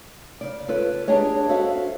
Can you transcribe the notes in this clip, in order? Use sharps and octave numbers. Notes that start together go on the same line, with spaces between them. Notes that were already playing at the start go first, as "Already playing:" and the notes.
C#3 D5
F4 A4 B4 C#5
A#3 D4 G4 G#4 C#5 D#5
F#4 A4 C5 E5 F5